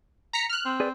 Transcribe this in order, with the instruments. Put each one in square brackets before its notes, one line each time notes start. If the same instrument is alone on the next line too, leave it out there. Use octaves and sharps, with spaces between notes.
[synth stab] A#5 B6 C#7
F6 F#6
[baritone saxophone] C4
[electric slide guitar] G#4 B4 D5